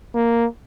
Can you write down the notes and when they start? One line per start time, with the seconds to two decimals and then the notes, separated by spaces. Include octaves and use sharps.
0.15 A#3